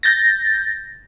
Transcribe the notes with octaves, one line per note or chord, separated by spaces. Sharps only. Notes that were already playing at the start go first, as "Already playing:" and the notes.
G6 A6 A#6